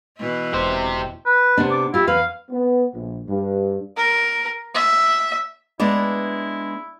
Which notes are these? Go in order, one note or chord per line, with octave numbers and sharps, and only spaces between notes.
B2 E3 E4
E1 G4 C5
B4
C3 B3 D4
D6
E4 F4 G4
E2 B4 F5
B3
A#1
G2
A#4
E5
G#3 B3 D4 E4 D5